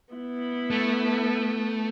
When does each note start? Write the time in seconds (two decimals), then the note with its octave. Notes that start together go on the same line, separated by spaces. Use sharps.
0.14 B3 E4
0.70 A3